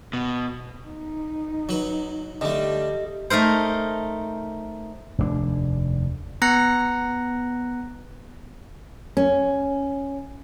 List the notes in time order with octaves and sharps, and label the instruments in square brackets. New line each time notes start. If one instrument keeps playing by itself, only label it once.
[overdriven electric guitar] B2
[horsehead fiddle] D#4
[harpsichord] F#3 B4
[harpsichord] D3 A3 [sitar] G3 [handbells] D#5
[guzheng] A3 D#4 A#4 C5
[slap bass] F1 D#2 A#2 D4
[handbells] B3 A#5 F#6 A#6 C#7
[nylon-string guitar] C#4